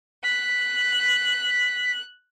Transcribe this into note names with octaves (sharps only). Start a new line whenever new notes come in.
F#6 B6